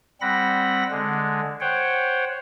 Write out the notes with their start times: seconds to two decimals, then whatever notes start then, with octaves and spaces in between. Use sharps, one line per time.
0.21 G3 C4 F#5 B5 A#6
0.91 D3 G#3
1.60 C5 C#5 F#5 G5